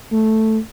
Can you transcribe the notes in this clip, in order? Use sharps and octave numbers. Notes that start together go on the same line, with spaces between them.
A3